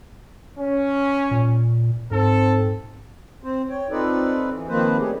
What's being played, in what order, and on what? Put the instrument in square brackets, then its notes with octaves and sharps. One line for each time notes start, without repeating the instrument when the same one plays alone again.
[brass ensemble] C#4
[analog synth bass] A#2
[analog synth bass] G#2 [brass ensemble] C4 A4
[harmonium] C4 C5
C#5 G5
C4 D#4 F4 A4 B4 D5
E3
D#3 F3 A#3 C4 B4 C5
G3 A3 C#4 G4 G#4